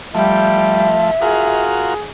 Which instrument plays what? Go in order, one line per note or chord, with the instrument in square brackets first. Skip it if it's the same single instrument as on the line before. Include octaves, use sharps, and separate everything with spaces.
[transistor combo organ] F3 A3 [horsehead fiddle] G3 G5 [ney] E5
[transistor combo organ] F4 F#4 A#4 [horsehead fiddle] G#4